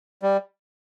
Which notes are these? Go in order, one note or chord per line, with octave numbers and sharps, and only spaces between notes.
G3